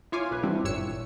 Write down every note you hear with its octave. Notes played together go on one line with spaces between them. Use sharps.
E4 F4 C#5 F5 G#5 D6
B1 B4
E3 G3 C4 D4 E4 G4
G#1 G2 A#2 C#5 E6 C#7